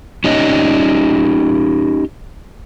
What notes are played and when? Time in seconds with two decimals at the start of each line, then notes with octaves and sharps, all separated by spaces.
0.24 C#4 D#4 G4 C#5 D#5